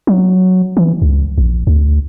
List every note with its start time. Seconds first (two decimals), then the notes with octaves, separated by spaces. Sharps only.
0.07 F#3
0.77 E3
1.02 C#2
1.38 A#1
1.67 D2